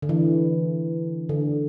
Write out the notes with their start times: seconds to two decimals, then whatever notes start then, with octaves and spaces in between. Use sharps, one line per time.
0.02 D3
0.09 E3
1.29 D3